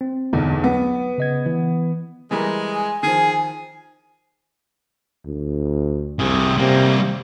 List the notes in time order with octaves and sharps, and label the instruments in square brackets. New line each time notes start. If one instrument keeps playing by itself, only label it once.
[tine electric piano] C4
[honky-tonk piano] B1 E2 [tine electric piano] D3
[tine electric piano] F#3 [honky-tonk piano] B3
[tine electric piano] C#3 D#5 G#6
E3
[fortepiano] E3 G3 A#4 [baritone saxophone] G#3
[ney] G#5
[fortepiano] D#3 F3 [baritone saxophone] G#4
[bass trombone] D2
[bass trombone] C2 [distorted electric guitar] C3 G#4
[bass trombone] C3 [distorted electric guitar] G3 A#3